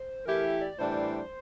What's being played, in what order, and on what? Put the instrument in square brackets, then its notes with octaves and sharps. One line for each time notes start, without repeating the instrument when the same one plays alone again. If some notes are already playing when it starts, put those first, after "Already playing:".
Already playing: [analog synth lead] C5
[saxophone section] E3 A3 E4 G4 [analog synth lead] A#4
[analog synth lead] D5
[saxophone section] A2 E3 G3 D4 [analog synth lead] C5